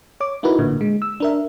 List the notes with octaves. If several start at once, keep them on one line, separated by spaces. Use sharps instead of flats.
C#5 D6
D#4 E4 F#4 A#4 B4
A1 A#2 D3
G#3
E6
D4 A#4 E5